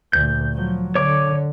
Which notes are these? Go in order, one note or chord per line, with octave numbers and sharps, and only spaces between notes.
D2 A#2 G6
F3 F#3
D3 C#5 D6